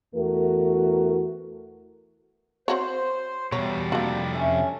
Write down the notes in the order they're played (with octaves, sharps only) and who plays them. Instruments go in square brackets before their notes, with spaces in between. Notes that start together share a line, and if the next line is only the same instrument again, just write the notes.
[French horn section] E2 E3 A3 F#4 A#4
[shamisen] C4 F#4 C#5 [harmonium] C5
[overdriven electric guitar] E2 B2 [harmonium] G3 [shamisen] C#5 [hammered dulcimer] A#5 C6
[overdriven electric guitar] F2 C3 [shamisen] A#3 F#4 [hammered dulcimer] D4 D#4 A4
[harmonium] C#4 [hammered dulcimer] E5